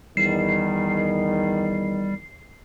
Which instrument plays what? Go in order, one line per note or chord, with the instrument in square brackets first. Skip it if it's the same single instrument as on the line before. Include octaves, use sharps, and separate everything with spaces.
[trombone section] E2 D#3 [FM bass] G3 [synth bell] C7